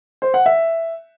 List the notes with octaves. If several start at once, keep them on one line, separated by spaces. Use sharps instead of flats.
C5
F#5
E5